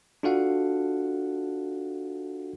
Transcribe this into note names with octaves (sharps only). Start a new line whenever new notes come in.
D4 F4 F#4 A4 F5 F#5